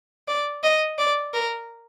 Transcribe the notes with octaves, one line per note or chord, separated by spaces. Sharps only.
D5
D#5
D5
A#4